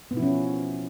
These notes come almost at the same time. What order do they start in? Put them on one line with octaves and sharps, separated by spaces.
B3 B2 E4 F3 C#4